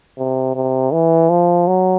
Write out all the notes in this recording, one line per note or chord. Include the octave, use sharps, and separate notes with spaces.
C3
C3
E3
F3
F#3